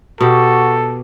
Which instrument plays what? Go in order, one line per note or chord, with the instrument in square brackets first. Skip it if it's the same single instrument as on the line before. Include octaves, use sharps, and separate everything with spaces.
[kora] B2 G4 [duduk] F#4 [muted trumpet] A4